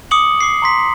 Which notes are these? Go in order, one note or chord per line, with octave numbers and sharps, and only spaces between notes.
D6 D#6 C#7 F#7
D6 C7
A#5 C6 B6